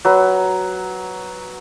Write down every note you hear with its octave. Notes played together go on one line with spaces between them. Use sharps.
F#3 B4